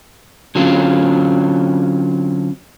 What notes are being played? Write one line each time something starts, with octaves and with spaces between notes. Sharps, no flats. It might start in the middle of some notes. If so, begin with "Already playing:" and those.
D3 F#3 C4 C#4 F4